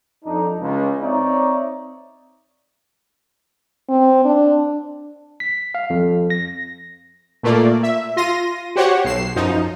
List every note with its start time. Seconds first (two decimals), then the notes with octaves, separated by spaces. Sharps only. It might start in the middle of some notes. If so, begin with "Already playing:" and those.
0.25 F2 D4 D#4
0.60 C#2
1.02 C4 D#4 C#5 D5 E5
3.89 C4
4.25 D4
5.40 B6
5.75 F5
5.90 F2
6.30 A#6
7.43 A#2 A3 A#3 F4 D5
7.83 E5
8.17 F4 C6 A#6 D#7
8.76 F#4 G4 C5 C#5 F#5
9.05 B1 C7 E7
9.36 F#2 F3 D#4